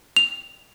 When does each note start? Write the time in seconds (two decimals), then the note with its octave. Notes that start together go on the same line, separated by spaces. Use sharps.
0.16 F7